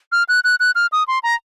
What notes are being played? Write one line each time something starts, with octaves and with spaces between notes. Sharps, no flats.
F6
F#6
F#6
F#6
F6
D#6
C6
A#5